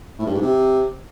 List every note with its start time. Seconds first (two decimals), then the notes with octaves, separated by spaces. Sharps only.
0.18 A2
0.26 G2
0.34 G#2
0.42 C3